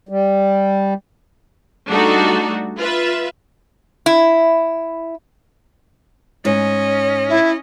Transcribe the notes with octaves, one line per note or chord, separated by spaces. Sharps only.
G3
G3 A3 D4 D#4 F#4 A4
F4 B4 E5
E4
G#2 C#4 C#5 D#5
E4